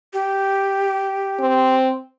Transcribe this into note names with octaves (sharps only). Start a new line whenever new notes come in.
G4
C4